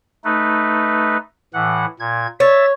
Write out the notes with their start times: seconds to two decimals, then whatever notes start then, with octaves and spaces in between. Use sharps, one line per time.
0.24 A3 D#4 B4
1.54 A2 E3 F#5
2.00 A#2 G#6
2.40 C#5 E5 A6